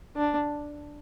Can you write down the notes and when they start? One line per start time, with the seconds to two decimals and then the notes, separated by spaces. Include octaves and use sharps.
0.16 D4